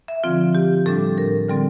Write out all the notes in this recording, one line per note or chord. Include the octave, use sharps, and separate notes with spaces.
E5
D3 F3 C4 F4
G4
A2 G3 D4 A4
A#4
D3 G3 C4 A4